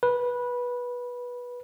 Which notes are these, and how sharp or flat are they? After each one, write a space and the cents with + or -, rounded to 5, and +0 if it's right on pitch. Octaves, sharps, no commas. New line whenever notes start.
B4 -15